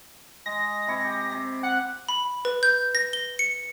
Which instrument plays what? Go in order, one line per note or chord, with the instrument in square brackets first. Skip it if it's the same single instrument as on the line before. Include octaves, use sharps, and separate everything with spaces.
[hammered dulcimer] G#3 [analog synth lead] A#6
[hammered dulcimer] C3 E4 C#6
G4
C3
[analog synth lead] F#5
[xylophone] B5
B4
G6
A#6
G7
C#7